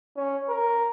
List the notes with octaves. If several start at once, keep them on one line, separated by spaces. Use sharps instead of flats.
C#4
A#4